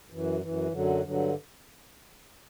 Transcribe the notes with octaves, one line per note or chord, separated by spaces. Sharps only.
F#2 E3
F#2 E3
F#2 D3 F#3
G2 D3 F#3